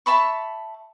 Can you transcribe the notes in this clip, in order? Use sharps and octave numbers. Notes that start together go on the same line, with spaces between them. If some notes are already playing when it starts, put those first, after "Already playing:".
E5 A5 B5 C#6